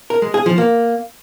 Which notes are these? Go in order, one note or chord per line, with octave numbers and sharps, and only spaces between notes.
A#4
G#3
G#4
F3
A#3